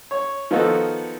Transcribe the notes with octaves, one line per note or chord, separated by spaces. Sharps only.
C#5
D#3 F3 B3 F4 F#4 A4